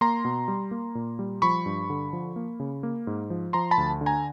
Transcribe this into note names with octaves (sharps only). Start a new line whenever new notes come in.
A#3 A#5 C6
B2
G3
A#3
A#2
G3
F3 B5 C#6
G2
D3
F3
A#3
C#3
A#3
G#2
F3
F3 A#5 C6
A5 B5
D2
D3
G#5 A#5